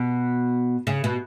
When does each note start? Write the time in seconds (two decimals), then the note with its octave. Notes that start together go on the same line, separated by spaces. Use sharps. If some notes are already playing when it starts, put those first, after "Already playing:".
Already playing: B2
0.87 C#3
1.04 B2